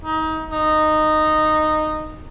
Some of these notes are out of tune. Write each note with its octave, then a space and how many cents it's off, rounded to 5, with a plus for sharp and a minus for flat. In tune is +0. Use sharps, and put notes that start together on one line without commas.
D#4 +25
D#4 -10